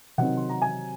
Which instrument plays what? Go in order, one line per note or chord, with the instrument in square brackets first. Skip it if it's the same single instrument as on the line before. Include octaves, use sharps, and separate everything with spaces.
[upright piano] C3 D#3 F#3 C4 D#4 F#5
C6
A#5
G#5